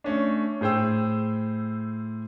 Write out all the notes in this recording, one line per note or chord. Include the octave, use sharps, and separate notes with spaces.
A3 C#4 D4
A2 G#4 C5 G5 E6